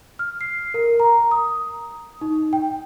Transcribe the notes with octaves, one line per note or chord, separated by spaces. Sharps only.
F6
C7
A#4
A#5
D#6
D#4
G5